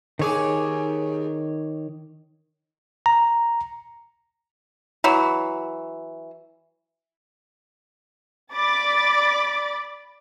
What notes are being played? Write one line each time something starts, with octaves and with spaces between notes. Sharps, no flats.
D#2 D#3 G#4 C#5 D6
A#5
E3 F#3
D5 B5 D6 A6